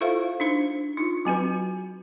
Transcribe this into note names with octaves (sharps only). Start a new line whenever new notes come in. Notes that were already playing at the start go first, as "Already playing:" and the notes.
E4 F4 A4 C5 E5 F5
D4 D#4 C5
D#4 F4
F#3 C4 F#4 B4